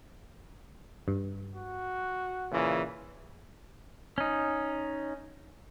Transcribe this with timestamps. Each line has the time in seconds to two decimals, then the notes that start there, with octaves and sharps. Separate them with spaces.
1.08 G2
1.54 F#4
2.52 A#2 C#3 E3
4.18 C#4 D#4